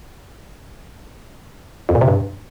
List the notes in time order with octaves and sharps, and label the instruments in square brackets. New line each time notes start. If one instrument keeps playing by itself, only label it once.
[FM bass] F2
A#2
C3
G2